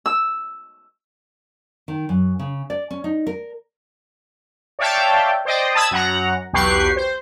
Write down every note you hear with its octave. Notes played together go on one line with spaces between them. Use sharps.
E6
D#3
F#2
C#3
D5
C#4
D#4
A#4
C#5 D5 E5 F5 G5 A5
C5 D5 D#5 G5
A5 B5 D#6 E6 G#6 E7
F#2 F#5 A#5
B1 E2 G4 B4 C#6 C7
C5